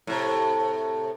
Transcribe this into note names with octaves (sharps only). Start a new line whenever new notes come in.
A2 C3